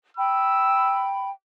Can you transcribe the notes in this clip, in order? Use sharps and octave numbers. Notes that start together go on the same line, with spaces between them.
G5 B5 E6